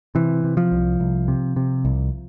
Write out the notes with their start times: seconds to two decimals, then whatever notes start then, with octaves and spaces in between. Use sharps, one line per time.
0.15 C3 E3
0.44 C3
0.57 F3
0.72 C2
1.00 C2
1.28 C3
1.56 C3
1.85 C2